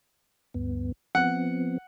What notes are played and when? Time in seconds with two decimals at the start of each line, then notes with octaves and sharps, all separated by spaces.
0.54 D2 G2 B3
1.15 F3 B3 C4 F#5